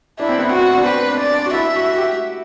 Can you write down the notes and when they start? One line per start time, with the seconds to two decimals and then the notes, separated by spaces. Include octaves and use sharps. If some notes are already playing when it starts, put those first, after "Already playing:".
0.20 D4 E4
0.29 C4
0.39 B3
0.49 C4 F#4
0.76 D4
0.86 C4 B4
1.08 D4
1.19 D5
1.31 D4
1.45 F#4
1.54 E4 E5
1.76 F#4
1.88 F#4
1.98 G4